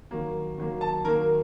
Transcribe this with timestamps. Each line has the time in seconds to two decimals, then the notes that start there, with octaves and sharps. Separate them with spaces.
0.11 D#3 F#3 A#3
0.58 D#3 F#3 A#3
0.81 A5
1.05 D#3 F#3 A#3 A#4